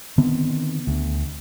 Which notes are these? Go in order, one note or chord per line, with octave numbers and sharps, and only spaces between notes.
D3 D#3 B3 C4
D2